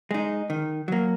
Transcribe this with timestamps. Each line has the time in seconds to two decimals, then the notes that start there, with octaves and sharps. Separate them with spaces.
0.11 G#3 D#4
0.50 D#3
0.88 F#3 A#3